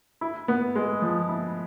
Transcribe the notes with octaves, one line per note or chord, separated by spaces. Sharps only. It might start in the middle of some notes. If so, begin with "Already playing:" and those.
E4
B3
G#3
F3
E4